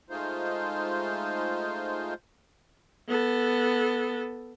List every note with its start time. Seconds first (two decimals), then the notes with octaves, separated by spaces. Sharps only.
0.10 G#3 A3 D#4 F4 C5
3.08 B3 A4